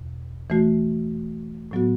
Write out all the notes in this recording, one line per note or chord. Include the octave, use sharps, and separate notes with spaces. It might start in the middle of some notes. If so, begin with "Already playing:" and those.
Already playing: E2 B2
E3 A3 F#4
A2 F#3 B3 F#4